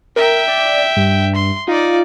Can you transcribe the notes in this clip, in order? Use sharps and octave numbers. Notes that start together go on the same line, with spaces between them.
A#4 E5 G5
D5
G2
C6
D#4 F4 D5